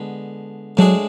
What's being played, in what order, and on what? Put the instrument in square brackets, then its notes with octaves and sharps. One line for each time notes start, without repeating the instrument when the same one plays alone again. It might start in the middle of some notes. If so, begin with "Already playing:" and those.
Already playing: [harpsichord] D3 G#3 B3
[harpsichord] A2 G#3 D4 G#4 [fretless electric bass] F#3